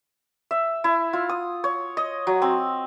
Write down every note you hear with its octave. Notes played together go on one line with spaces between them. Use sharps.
E5
E4
F4
D#6
C#5
D#5
F#3
C4